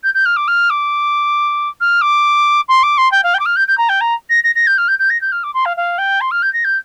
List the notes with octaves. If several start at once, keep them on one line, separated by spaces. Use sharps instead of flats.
G6
G6
F6
D6
F6
D6
F6
D6
C6
D6
C6
G5
F5
G5
D6
F6
G6
G6
A#5
G5
A#5
A#6
A#6
A#6
G6
F6
G6
G6
A#6
G6
F6
D6
C6
F5
F5
G5
C6
F6
G6
A#6
G6